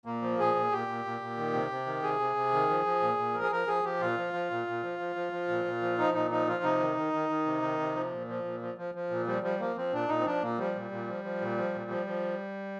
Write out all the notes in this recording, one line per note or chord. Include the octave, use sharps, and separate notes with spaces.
A#2 A#3
F3
A#2 G#4
A#2
A#2 G4
A#2
A#2
A#2
D#3
C3
C3
D#3
C3 G#4
C3
C3
D#3
F3
F3
A#2
A#2
F3 A#4
G#4
F3 A#4
F3 G#4
F3 G4
A#2 F4
F3
F3
A#2
A#2
F3
F3
F3
F3
A#2
A#2
F3
F3 D#4
A#2 D#4
F3 D#4
F3 F4
C3 D#4
D#3
D#3
D#3
D#3
C3
D#3
C3
F3
A#2
F3
A#2
F3
F3
F3
A#2
F3 G3
F3 G3
F3 A#3
F3 C4
A#2 D4
A#2 D#4
C4
F3 D4
A#2 A#3
F3 G3
A#2
A#2
F3
F3
A#2
F3
A#2
F3
F3